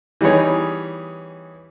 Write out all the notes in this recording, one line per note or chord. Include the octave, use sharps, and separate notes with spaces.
E3 G3 B3 D#4 G#4 C#5